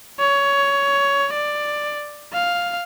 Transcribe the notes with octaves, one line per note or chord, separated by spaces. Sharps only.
C#5
D5
F5